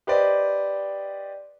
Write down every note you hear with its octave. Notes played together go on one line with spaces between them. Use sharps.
G4 B4 C5 D5 D#5